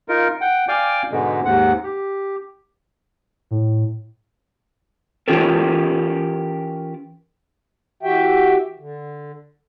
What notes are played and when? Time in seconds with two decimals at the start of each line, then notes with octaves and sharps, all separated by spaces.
0.09 D#4 F4 A#4
0.41 F#5 G5
0.68 D5 F5 G5 G#5 D6
1.11 G#2 B2 D3 G#3
1.45 D#2 G#2 F#5
1.84 G4
3.51 A2
5.28 E3 C#4 F4 G4 A4 A#4
8.03 E3 F#4 G4 E5 G5
8.79 D3